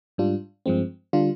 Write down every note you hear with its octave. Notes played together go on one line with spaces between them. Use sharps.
G#2 G3 D4 F4
G2 F3 G#3 C4
D3 G3 D4 F4